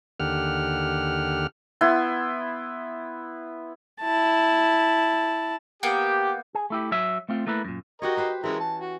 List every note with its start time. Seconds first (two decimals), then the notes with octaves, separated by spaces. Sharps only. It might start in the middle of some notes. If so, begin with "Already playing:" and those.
0.20 D#2 D3 G4 F#5 F6
1.81 B3 E4 C6
4.01 E4 A5
5.83 A#3 B3 G4 G5
6.55 G#4
6.70 A3 E4 G4
6.91 F#3 C#5 E5
7.29 A3 C4 F4
7.47 A3 A#3 E4 B4
7.65 F#2 A#2
8.02 F#4 G4 A#4 C#5 D#5
8.17 G4 B4 C5
8.44 E3 G#3 C#4 E4 A#4
8.60 A5
8.80 F#4